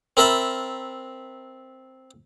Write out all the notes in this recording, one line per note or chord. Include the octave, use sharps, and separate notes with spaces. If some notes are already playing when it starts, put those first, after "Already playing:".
C4 A#4 E5 A5 B5